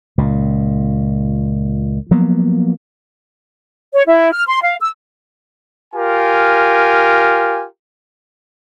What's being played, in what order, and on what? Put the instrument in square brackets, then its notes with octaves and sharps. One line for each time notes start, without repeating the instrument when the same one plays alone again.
[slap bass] C#2 A#2
F3 F#3 A#3 B3
[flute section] C#5
E4
F6
C6
F5
E6
[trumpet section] F4 G4 A#4 G#5